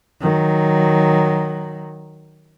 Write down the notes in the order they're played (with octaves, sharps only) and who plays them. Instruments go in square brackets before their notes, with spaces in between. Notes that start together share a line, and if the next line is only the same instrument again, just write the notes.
[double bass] D#3 F#3